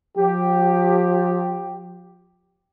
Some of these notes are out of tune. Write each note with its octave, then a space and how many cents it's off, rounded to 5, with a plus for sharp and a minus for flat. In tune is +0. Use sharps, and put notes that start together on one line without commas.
F3 +35 G4 +0